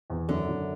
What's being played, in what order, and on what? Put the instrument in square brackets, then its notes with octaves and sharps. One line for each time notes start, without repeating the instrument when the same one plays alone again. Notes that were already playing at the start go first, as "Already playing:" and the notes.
[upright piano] E2
[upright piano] F#2 [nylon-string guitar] D3
[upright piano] F#2